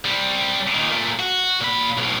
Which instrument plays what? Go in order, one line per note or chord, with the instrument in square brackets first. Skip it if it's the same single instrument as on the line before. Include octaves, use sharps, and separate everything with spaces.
[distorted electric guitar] C3 G3
A#2 D#3
A#2 A3
F#4
A#2 B5
B1 A2